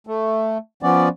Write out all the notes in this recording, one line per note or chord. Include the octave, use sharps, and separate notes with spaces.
A3
F3 B3 C#4 D5